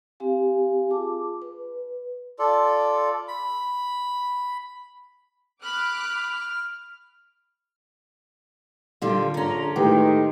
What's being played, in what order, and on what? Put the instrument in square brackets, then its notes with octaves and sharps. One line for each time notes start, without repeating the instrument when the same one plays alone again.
[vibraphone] C4 G4 F5 G#5
F4 G#4 A5 D6
B4
[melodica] F4 A4 D5
B5
[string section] B5 D6 F#6 [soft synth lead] F6
[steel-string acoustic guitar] A#2 D3 G3 [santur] F4
[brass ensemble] A#1 A#5 [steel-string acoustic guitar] D3 C#4
[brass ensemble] A2 D#3 [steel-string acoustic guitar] G#3 [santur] G4 B4